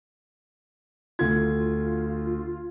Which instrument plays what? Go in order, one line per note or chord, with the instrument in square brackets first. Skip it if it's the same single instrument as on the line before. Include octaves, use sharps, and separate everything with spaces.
[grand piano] D2 G#6 [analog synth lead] F4